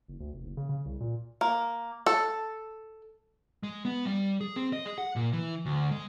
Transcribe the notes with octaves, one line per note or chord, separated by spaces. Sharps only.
F#1
D2
F1
F#1
C#3
C#3
C2
A#2
A#3
A4
G#3
B3
G3
G#4
C4
D#5
G#4
F#5
A#2
E3
D2
G#3